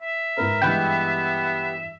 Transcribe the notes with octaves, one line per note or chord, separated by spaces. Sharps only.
E5
G#2 A#4 B4
G2 E3 G#3 B3 G4 B4 G5